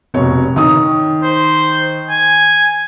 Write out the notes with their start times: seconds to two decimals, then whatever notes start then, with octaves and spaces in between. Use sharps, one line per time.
0.14 F1 B2 C#5
0.56 D#3 D#6
1.24 C5
2.11 G#5